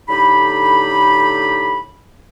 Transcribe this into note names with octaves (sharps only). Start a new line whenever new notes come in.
A2 D3 D#4 G4 B5